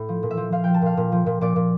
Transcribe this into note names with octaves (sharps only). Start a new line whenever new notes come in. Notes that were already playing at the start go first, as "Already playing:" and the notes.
Already playing: A2
F3
A#2
E5
F3
F3 F5
F3 G5
A5
A#2 F5
A#2
F3
A#2
A#2 D5
A#2